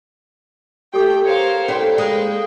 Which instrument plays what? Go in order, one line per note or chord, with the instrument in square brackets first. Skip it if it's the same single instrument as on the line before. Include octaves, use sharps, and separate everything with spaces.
[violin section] A3 G5 [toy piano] G4 A4 D6
[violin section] A#4 C5 F5 [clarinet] C#5
[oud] A3 D4 [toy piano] C#4 C5 C6 [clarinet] E4 [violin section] G5
[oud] G#3 A#3 [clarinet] G#4